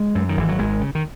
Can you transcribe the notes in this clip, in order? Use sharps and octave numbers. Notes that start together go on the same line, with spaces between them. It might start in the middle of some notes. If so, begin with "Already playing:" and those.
Already playing: G#3
F#2
D#3
G#1 E3
F#3
G#1 G#3
C#3
D#3